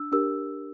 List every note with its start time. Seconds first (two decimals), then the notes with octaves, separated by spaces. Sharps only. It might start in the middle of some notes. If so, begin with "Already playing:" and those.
Already playing: D4 E6
0.12 D4 G4 A#4 E6